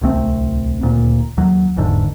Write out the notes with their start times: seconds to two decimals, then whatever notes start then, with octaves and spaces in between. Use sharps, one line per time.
0.01 D1 C2 A3 C4
0.81 D#1 D2 A#2
1.37 D#2 F#3
1.76 F#1 E2 G#2 D3